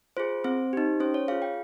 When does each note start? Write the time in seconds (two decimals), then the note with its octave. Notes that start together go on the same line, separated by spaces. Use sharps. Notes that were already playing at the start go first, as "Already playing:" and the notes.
0.17 F4 G#4 C5
0.44 C4 C5
0.73 D#4 G4
1.00 C#4 C5
1.14 C#5
1.28 F4 G#4 F5
1.42 G5